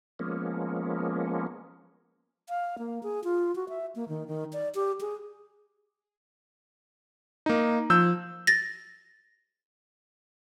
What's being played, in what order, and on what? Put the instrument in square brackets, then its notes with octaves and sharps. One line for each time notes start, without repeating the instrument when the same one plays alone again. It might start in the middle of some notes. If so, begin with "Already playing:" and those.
[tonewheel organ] F3 G#3 A#3 B3 C#4
[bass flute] F5
A#3
G#4
F4
F#4
E5
A#3
D#3
D#3
D5
G4
G#4
[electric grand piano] A#3 D#4
F3 E6 G6
[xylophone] A6 A#6